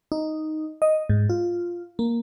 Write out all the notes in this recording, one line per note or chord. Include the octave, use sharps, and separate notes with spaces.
D#4
D#5
G#2
F4
A#3